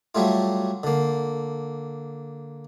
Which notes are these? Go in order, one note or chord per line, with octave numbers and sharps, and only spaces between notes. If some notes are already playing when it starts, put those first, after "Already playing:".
F#3 G3 A3 F4
D3 A#3